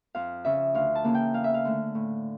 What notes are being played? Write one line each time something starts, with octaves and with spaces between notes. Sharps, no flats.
F2 F5
C#3 F3 E5
D2 F5
A5
C#3 E3 A#3
G5
E2 F5
E5
F5
D3 A3
A2